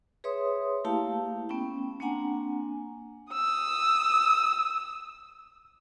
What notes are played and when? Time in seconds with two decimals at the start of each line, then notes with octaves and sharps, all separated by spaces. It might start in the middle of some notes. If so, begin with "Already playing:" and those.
0.24 G#4 B4 C#5 E5 C6 D#6
0.84 A3 A#3 E4 G4 F5 A5
1.49 B3 C#4 G5
2.00 A#3 C4 D4 F#5 G#5 A#5
3.33 D#6 E6